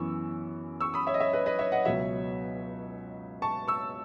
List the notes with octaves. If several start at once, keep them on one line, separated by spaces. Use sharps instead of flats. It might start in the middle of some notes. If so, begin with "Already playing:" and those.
Already playing: F#2 E3 B3 C#6 E6
C#6 E6
B5 D#6
C#5 E5
D#5
C#5 E5
B4 D#5
B4 D#5
C#5 E5
D#5 F#5
C#2 B2 F#3 C#5 E5
A5 C#6
C#6 E6